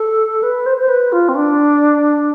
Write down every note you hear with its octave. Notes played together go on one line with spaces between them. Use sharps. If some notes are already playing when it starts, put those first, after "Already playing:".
Already playing: A4
B4
C5
C5
B4
F4
C4
D4